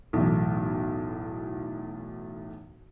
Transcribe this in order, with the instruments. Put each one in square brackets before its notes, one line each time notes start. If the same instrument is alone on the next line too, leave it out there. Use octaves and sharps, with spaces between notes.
[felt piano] B1 E2 A2